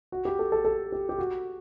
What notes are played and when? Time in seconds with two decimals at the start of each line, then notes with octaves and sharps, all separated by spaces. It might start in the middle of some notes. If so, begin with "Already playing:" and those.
0.12 F#4
0.25 G4
0.39 A4
0.52 A4
0.65 A4
0.92 G4
1.09 G4
1.19 F#4